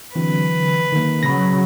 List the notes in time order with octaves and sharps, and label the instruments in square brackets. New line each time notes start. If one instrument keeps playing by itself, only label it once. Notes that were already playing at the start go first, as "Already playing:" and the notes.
[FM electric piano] D3 F#3 C4 [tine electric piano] E3 [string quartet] B4
[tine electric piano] D#3 A#3
[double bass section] C#3 F#3 [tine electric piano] B5 A#6